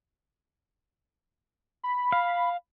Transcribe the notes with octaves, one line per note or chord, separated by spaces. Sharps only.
B5
F5